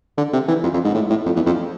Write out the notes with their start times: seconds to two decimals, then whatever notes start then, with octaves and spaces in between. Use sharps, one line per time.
0.17 D3
0.33 C3
0.48 E3
0.63 F2
0.73 F2
0.85 G#2
0.95 A2
1.10 A2
1.26 F2
1.36 E2
1.46 F2